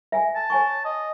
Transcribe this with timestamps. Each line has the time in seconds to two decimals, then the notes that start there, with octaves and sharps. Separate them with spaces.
0.12 E5 G#5
0.36 A5
0.50 C#5 G#5 C#6
0.85 D#5